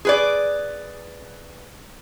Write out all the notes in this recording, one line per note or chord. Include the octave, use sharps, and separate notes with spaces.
G#4 B4 D5